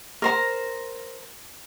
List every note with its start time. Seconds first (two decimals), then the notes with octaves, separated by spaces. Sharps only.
0.22 A#4 C5 A#5